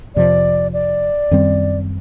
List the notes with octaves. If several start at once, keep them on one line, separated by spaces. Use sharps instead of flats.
F2 C3 F3 D5
D5
F#2 D#3 G3 C4